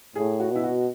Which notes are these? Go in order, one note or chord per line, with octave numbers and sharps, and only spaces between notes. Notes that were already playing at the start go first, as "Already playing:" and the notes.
A2 G#4
F#4
B2 E4
F#4